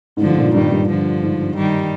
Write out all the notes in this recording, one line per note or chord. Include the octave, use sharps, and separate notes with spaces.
G#2
G2 D3 F3
G#2
A#2
G#2
G2 D#3 G3
G2
D3 F3
G#2
D#3 G3